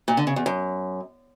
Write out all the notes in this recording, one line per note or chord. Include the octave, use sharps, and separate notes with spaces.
A#2
D3
C#3
E2
F#2